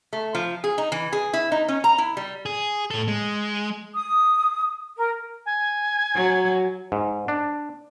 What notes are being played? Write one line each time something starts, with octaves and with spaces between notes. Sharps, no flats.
A3
F3
G#4
D#4
E3
G#4
E4
D#4
C#4
A#5
E4
G3
G#4
A2 A4
G#3
D#6
A#4
G#5
F#3
G#2
D4